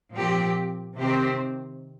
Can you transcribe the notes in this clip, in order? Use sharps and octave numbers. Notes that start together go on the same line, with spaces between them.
A#2 F3 C4 G4
C3 D#3 C4 G4 C5